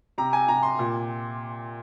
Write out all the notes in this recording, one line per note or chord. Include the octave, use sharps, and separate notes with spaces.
C3 A#5
G#5
C3 A#5
C6
A#2